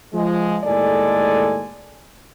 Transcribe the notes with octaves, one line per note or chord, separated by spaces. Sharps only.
F3 G#3
D#2 A2 G#3 A4 D5 G#5